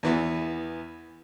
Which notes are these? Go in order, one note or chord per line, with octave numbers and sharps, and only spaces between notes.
E2 E3 B3